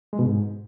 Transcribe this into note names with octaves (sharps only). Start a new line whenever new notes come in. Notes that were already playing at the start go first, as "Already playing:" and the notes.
G#3
B2
G#2